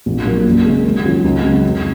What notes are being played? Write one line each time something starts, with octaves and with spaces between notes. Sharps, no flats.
A#1
A#2 F#3 A#3
F#2
C#3 G#3
D#2
D#3 F#3 C#4 F4
C#2
C#3 F#3
F2